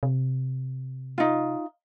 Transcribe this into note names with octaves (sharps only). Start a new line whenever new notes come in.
C3
D#4 F4